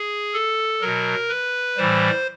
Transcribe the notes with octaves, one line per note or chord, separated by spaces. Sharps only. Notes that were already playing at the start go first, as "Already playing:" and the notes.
Already playing: G#4
A4
B2 F#3 A#4
B4
A2 E3 G3 C5